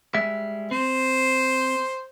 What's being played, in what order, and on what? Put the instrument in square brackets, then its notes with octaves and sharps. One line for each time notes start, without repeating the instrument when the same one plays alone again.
[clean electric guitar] G3 G#3 E5
[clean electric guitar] C4 [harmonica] C5